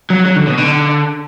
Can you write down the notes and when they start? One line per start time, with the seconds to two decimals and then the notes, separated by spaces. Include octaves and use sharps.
0.10 F#3
0.25 F#3
0.36 D3
0.47 B2
0.58 D3